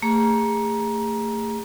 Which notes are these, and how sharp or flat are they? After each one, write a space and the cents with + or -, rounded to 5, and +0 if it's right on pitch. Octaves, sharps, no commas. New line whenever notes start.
A3 +35 G#4 -30 A#5 +20